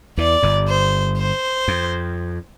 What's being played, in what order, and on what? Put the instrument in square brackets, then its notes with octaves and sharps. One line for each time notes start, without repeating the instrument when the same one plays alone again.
[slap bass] E2 E3 [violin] D5
[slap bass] G1 G2
[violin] C5
C5
[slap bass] F2